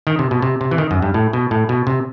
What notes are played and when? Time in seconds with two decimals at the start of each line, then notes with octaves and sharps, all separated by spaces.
0.07 D#3
0.19 C3
0.31 B2
0.42 C3
0.61 C3
0.71 E3
0.78 D#3
0.91 F#2
1.02 G2
1.14 A2
1.33 B2
1.51 A2
1.69 B2
1.87 C3